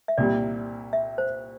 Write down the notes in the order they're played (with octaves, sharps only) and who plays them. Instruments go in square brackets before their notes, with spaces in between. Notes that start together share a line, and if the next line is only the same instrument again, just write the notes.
[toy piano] E5
[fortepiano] C2 A#2 G3 [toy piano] D5
[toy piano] E5
C5